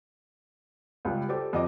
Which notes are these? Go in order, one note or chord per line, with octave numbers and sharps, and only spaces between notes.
C#2 G3
G4 A4 C5
F2 D#5 D6